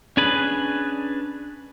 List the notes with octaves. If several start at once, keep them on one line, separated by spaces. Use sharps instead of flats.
C#4 D4 G#4 B4